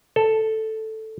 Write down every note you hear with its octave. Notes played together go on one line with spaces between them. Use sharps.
A4